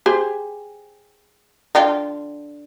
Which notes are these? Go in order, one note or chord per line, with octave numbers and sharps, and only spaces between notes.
G4 G#4 C5
D3 F4 G5